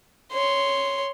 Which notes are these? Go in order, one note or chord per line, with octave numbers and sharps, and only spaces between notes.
C#5 C6